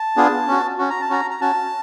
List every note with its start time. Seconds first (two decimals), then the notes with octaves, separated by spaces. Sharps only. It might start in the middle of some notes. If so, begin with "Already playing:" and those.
Already playing: A5
0.17 B3 D4 F4 G#4
0.48 C#4 F#4
0.78 C#4 F#4
0.90 A#5
1.01 A5
1.10 C#4 F#4 A#5
1.31 A#5
1.41 C#4 F#4 A5